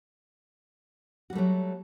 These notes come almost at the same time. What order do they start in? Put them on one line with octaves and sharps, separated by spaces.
F#4 G3 A3 F#3